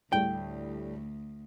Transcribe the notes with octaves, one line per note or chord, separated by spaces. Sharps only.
D2 A2 G3 A3 G5